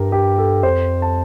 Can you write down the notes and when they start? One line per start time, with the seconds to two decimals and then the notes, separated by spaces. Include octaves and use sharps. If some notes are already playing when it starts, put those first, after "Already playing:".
Already playing: G2 G4 A#4
0.12 G4
0.38 A4
0.63 F2 C5
1.02 A5